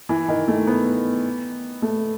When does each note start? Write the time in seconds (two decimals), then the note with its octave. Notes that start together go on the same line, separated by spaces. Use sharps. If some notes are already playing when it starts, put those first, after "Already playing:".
0.09 E3
0.28 D#3
0.48 A3
0.67 B3
1.82 A3